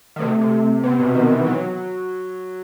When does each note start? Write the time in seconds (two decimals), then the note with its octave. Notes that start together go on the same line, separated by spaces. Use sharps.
0.16 D#3
0.20 C3 A3
0.41 C3
0.83 C3 B3
0.99 B2
1.15 D#3 B3
1.31 E3
1.46 F#3